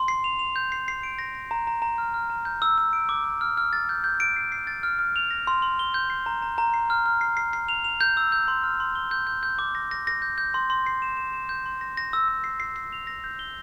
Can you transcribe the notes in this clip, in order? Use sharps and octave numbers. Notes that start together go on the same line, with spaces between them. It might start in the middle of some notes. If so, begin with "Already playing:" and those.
Already playing: C6
C7
F7
F7
G6
C7
C7
D7
A#6
A#6
A#5
A#5
A#5
F6
F6
A#5
G6
E6
E6
D7
D6
D6
F6
F6
A6
G6
G6
D7
C7
C7
A6
F6
F6
F7
A#6
C6
C6
G7
G6
C7
A#5
A#5
A#5
C7
F6
F6
C7
C7
C7
F7
F7
G6
E6
G6
C6
F6
C6
G7
G6
G6
G6
D6
A#6
A#6
A#6
G6
G6
C6
C6
C7
E7
E7
E7
G6
C6
A#6
A#6
E6
E6
C7
C7
C7
F7
A#6
G6
G7